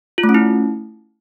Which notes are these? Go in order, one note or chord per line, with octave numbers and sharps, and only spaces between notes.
F4
A3
C#4
E4